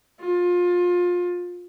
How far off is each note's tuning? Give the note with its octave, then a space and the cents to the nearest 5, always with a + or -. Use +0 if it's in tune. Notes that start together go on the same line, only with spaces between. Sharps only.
F4 +25